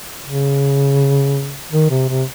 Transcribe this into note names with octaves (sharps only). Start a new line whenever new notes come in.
C#3
D#3
C3
C3